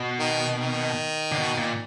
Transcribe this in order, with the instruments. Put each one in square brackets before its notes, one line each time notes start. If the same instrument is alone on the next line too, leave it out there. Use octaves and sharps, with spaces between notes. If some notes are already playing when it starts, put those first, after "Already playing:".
Already playing: [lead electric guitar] B2
[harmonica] D#3
D#3
[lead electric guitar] D3
B2
A#2